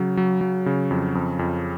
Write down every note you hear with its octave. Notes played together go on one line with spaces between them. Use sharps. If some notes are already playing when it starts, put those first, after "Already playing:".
Already playing: C#3 F#3
F#3
F#3
C#3
F2
F2
F2